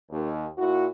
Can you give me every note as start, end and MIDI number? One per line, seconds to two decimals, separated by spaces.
0.10 0.46 39
0.58 0.86 46
0.58 0.86 64
0.58 0.86 66